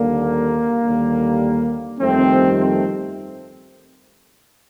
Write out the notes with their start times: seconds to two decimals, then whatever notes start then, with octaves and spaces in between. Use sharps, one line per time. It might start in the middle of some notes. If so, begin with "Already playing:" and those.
Already playing: D#2 D3 G3 A#3
0.83 D#2 D3 G3
2.00 G1 F2 D#3 G3 A3 C4
2.58 A3 C4